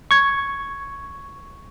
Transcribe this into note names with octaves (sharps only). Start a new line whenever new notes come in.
C#6 G#6